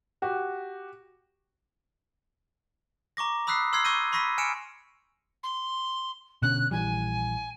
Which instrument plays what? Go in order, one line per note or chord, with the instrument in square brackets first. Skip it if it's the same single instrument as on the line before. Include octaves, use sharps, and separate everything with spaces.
[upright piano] F#4 G4
[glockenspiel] A#5 C#6 D6 A#6
B5 D#6 E6 F#6 B6 C7
C6 E6 F6 G#6 C7
C6 C#6 E6 G6 A#6 D#7
B5 C#6 E6 A#6 B6 D#7
G#5 F6 C#7 D7 E7
[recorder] C6
[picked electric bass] B2 D3 C#4 [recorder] F#6
[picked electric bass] A#1 E3 G3 [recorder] G#5